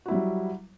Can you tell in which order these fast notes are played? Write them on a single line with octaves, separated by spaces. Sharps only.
F#4 E4 G3 F#3